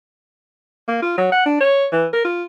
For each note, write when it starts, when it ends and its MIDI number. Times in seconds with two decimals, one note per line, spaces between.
0.88 1.00 58
1.02 1.14 65
1.18 1.27 54
1.32 1.42 78
1.46 1.60 62
1.60 1.87 73
1.92 2.06 52
2.13 2.23 70
2.24 2.44 65